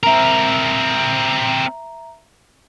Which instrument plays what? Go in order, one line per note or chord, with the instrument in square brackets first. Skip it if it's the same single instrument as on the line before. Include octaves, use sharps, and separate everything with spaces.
[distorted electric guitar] C4 A#4 [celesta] E5 A#5